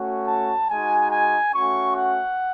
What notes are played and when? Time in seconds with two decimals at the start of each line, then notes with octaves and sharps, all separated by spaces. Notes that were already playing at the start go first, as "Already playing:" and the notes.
Already playing: A3 C#4 F#4
0.28 A5
0.70 G#3 D#4 F#4 G#5
1.11 G#5
1.54 A3 C#4 F#4 C#6
1.96 F#5